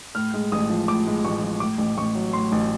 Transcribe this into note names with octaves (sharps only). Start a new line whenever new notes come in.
A2 F6
G#3
A1 D#6
F3
A2 D6
G#3
A1 C#6
F3
A2 D6
A1
A1 C#6
F#3
A2 C6
A1